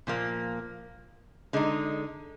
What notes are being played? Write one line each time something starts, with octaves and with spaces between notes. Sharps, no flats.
A#2 F3 A#3
D3 G#3 D#4